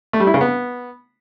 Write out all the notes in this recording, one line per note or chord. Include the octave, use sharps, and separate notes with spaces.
A3
G3
E4
C#3
B3